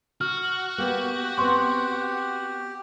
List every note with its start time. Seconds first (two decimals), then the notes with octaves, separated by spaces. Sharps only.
0.21 F#4 F6
0.78 A#3 B3 G4
1.38 B3 C4 C6 C#6